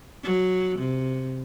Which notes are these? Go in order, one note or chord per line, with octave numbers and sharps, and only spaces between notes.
F#3
C3